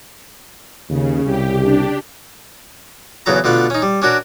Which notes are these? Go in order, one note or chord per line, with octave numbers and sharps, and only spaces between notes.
D#2 C#3
C2 G4
D4 G4
E2 C#3 F#3 A4 A#5
B2 D3 A3 F4 B5
C#4 D#4
G3
C#4 D4 F#4 A#4